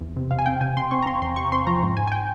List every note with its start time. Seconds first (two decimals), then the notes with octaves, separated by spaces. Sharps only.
0.01 E2
0.16 C3
0.31 C3 F5
0.39 G#5
0.46 C4 G5
0.61 C3 G#5
0.77 C3 C6
0.91 C4 C#6
1.02 A#5
1.06 C4 C6
1.22 E2 C6
1.36 C3 C#6
1.52 C4 C6
1.67 F3 A#5
1.83 G#2
1.97 G#2 G#5
2.07 G#5
2.12 G5